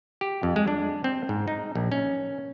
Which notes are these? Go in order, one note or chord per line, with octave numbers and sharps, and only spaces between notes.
G4
F2
G#3
D4
C4
G#2
D#4
A#1
C#4